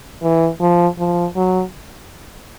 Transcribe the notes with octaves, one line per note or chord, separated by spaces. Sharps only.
E3
F3
F3
F#3